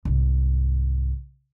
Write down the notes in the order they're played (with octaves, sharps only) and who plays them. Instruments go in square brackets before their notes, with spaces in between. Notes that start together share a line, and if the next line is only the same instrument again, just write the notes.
[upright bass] C2 G#2